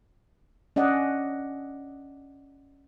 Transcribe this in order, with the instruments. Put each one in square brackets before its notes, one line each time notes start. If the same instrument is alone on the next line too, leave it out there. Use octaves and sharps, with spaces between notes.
[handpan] C#4 D5 D#5 F#5